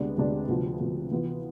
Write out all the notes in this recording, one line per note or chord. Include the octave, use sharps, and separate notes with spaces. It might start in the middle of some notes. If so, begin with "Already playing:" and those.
Already playing: D2 C3 G#3 B3 D4
D2 C3 G#3 B3 D4
D2 C3 F3 B3
D2 C3 F3 B3
E3 B3 F4